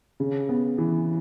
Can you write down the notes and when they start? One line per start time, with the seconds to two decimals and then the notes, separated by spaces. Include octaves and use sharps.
0.20 C#3
0.49 B3
0.78 E3